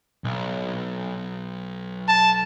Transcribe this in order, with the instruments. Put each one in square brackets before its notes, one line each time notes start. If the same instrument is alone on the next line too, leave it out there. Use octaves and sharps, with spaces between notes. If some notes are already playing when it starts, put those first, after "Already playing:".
[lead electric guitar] B1
[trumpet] A5